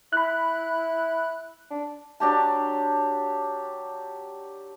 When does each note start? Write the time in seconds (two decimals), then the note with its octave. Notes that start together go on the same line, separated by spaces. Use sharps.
0.13 E4 B5 F#6
1.71 D4
2.20 F#3 D4 G4 A5